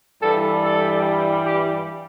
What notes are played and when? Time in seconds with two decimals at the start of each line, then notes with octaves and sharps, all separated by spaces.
0.22 G2 E3 G3 A4
0.62 A4
1.44 G4